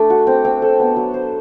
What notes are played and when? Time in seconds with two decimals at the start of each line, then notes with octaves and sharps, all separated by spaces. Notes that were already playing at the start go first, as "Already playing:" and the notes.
Already playing: A3 D4
0.10 F#4
0.27 C4
0.45 C4
0.62 A4
0.80 B3
0.96 F#3
1.14 C5